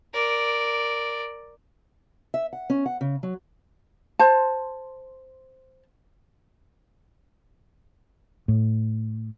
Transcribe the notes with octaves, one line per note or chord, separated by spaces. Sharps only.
A#4 D5
E5
F#5
C#4
F#5
C#3
F#3
C5 A5
A2